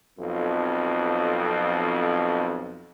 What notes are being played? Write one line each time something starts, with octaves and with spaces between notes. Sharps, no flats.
B1 F2